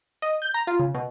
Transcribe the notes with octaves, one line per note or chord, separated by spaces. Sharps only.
D#5
G6
A#5
F4
C#3
B2